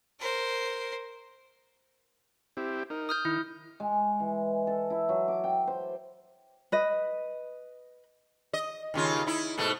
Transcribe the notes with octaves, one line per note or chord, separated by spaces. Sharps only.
A#4 C5
C4 E4 G4
D#4 A#4
D#6 F6 G6
D#3 E4
G#3
E3
A4
E4
F#3
D6
G5
C5
B4 D#5
D#5
D#2 C#3 F4
D#4 E4
G#2 B2 A3